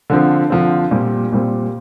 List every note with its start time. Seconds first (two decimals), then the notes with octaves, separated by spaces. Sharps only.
0.10 D3 F3 C4
0.50 D3 F3 C4
0.91 A#2 G3 C4
1.32 A#2 G3 C4